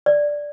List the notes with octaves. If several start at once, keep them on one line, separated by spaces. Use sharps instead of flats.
D5